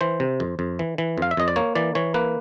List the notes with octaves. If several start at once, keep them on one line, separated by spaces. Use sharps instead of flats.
E3 C5
C3
F2
F2
E3
E3
F2 F5
E5
F2 D#5
D5
A#3 C#5
E3 D5
E3 C#5
A#3 B4